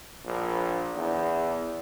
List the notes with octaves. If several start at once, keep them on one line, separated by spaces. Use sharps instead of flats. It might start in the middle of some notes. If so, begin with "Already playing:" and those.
A#1
E2